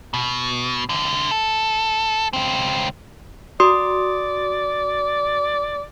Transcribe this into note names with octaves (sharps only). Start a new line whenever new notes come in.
B2
C2 D3
A4
C#2 C4
F#4 D5 C6 D#6